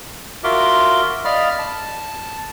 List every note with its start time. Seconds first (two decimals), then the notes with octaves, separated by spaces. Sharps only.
0.44 F4 F#4 A#4 E5 C6 D6
1.25 D5 D#5 F5 B5 F6
1.59 A5